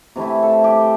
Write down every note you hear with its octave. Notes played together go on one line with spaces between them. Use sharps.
C3 E3 A3 E4
A4
G4